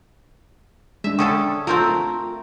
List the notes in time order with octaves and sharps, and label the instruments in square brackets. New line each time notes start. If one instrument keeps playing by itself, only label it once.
[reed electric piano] G#3 D4 [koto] E5
[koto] D3 C#4 A4 [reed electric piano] G5 C#6 D#6
[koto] A3 C4 A#4 [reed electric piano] F4